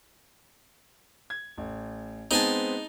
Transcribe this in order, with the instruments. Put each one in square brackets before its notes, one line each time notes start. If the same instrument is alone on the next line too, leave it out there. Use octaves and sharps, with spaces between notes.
[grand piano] G#6
A1
[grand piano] G#3 B3 C4 [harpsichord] D#4 G#5 A5